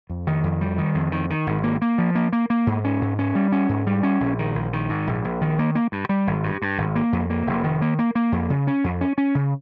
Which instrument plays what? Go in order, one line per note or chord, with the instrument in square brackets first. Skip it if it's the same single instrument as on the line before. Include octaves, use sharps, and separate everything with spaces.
[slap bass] F2
D#3
F2
G3
D#3
F2
D#3
D#3
G#1
A#3
A#3
F3
A#3
A#3
A#3
G#2
C#4
G#2
C#4
G3
C#4
G#2
G3
C#4
A#1
D#3
A#1
D#3
G#2
A#1
A#1
D#3
A#3
A#3
G2
G3
G#1
G2
G2
G#1
A#3
F2
A#3
F1
D#3
A#3
A#3
A#3
F2
C#3
C#4
F2
C#4
C#4
C#3